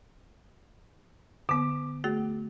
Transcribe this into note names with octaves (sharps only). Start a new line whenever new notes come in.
D3 B3 D6
A3 F#4 G#4